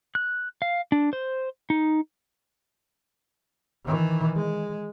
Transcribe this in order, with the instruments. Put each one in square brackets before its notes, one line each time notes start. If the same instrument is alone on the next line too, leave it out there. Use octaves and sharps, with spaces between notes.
[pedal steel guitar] F#6
F5
D4
C5
D#4
[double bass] D#3 E3
G#3